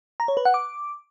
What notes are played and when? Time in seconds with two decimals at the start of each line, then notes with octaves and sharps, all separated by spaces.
0.20 A#5
0.28 C#5
0.37 B4
0.45 F#5
0.54 D6